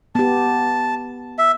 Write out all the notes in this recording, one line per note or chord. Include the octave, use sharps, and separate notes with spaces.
B3 G4 A5
E5